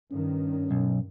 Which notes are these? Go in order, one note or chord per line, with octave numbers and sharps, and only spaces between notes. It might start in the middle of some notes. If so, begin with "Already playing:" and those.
G2 D#3 C#4
B1